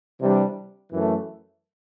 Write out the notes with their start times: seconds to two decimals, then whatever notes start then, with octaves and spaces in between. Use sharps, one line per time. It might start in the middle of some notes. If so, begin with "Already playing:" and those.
0.20 C3 E3 G3 D4
0.90 F#2 E3 A3